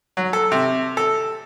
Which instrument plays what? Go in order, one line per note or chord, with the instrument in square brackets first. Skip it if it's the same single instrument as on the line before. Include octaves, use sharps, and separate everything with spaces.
[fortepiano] F#3
A4
C3
A4